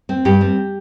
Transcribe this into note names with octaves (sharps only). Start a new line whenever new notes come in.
C4
G2 G4
C4